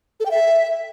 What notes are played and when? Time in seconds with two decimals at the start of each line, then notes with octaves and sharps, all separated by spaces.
0.20 A4
0.25 G5
0.31 E5